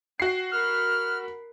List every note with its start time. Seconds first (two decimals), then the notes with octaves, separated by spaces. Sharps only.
0.20 F#4 G5 C7
0.52 A#4 B5 F6